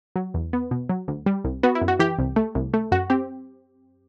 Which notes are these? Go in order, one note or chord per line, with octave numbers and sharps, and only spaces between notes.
F#3
E2
B3
B2
F#3
D2
G3
C2
B3 F#4
E4
F#2
F#4
E3 G4
C2
A3
C2
A3
F#2 F#4
C4 G4